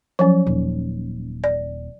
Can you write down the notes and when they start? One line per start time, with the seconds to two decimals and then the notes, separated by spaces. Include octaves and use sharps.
0.19 F3 F#3 C#4
0.47 D#1
1.44 D5